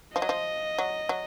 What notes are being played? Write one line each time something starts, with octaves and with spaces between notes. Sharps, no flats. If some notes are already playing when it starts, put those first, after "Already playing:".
F3 D#5
F#3
F3
F#3
F#3